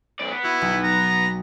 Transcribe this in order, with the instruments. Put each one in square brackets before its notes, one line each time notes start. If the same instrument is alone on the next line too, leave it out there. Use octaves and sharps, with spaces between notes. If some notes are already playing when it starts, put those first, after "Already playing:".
[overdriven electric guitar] B1 D5
B3
[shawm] E4 [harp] F#4
[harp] B1
[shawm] A#5